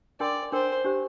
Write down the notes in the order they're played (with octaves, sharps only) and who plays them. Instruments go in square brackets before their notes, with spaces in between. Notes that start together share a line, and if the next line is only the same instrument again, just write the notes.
[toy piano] D4 A#4 G5 C6 [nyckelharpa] D5
[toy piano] D4 A#4 G5 [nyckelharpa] C5
[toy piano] D4 G4 C5